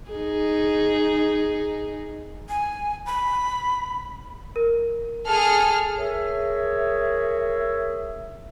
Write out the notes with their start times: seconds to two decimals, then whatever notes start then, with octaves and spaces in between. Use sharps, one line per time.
0.10 D#4 G#4
2.49 G#5
3.06 B5
4.56 A#4
5.28 G#4 A4 F6
5.98 G#4 A#4 C#5 E5